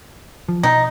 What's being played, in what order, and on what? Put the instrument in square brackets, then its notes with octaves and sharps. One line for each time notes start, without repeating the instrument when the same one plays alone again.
[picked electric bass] F3
[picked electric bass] B2 [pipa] D#4